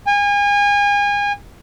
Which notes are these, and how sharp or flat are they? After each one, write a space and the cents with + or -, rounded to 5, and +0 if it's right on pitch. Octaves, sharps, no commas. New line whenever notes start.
G#5 -35